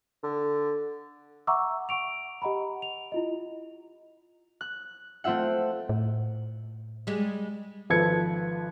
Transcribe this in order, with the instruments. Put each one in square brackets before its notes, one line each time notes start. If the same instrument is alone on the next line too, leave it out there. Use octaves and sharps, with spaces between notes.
[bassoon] D3
[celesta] E5 F#5 A#5 C#6 D6 E6
F#5 C#6 D7 F7
G4 D#5 F#5 A#5 B5
F7
E4 F4 D#5
[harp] F#6
A3 C4 F4 E5 F#5
[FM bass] A2
[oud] G3 G#3
[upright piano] G#1 F3 A4 B4 G#6 C#7